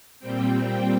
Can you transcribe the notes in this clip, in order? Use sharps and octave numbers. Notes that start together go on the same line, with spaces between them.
A#2 G3 C4 G5